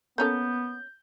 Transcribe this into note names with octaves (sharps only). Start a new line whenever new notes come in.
A#3 B3 C#4 A4 G6